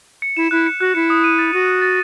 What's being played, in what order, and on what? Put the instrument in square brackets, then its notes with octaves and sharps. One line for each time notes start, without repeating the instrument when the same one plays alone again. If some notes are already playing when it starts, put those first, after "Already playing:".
[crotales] C#7
[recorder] E4 [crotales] E7
[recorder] E4 [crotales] F#6
[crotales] C#7
[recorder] F#4 [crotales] F#6
[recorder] E4 [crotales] C#7
[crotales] D#6
D#7
A6
[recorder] F#4 [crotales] D#7
[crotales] D#6
A6